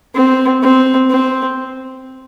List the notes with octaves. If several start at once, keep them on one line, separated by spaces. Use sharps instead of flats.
C4
C4
C4